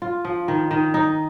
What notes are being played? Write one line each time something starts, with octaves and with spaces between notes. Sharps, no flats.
F4
F3
D#3
D#3
D#4